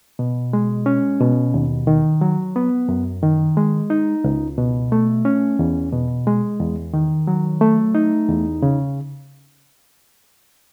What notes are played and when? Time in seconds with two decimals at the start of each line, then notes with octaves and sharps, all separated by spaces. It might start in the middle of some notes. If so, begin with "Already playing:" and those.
0.19 B2
0.53 G#3
0.86 C#4
1.20 B2
1.54 D#2
1.87 D#3
2.21 F#3
2.56 B3
2.89 F#2
3.23 D#3
3.57 G#3
3.90 D#4
4.24 C#2
4.58 B2
4.92 A3
5.25 C#4
5.59 E2
5.92 B2
6.27 G#3
6.60 E2
6.94 D#3
7.27 F#3
7.61 A3
7.95 D#4
8.28 E2
8.62 C#3